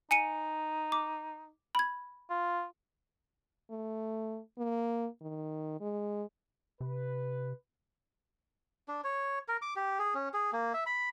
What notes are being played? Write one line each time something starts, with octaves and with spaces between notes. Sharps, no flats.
D#4 G#5 C#7 D#7
D6
B5 G#6
F4
A3
A#3
D#3
G#3
C3 B4
D4
C#5
A#4
D6
G4
G#4
C#4
G#4
A#3
E5
B5